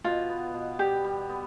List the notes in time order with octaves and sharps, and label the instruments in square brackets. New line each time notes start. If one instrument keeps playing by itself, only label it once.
[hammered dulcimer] B2 [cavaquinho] F4
[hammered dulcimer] B3
B2
[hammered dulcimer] G3 [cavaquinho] G4
[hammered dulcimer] G3
B3